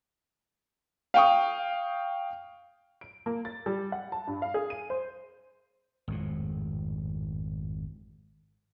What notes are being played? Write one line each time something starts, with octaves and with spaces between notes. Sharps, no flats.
F5 G5 C#6 D#6
D7
A#3
A6
G3
F#5
A5
G2
F5
G#4
D#7
C5
G#1 F2 A2